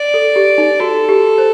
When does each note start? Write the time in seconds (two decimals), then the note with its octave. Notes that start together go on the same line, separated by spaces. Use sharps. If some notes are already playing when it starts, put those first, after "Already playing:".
Already playing: D5
0.14 A4
0.36 G4
0.58 D#4
0.80 F#4 A4
1.09 G4
1.38 C5